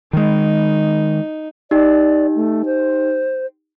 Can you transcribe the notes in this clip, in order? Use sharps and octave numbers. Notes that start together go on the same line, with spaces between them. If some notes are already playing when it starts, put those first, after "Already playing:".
D#3 G#3 D#4
D#4 G4 D5 G5
A3
C5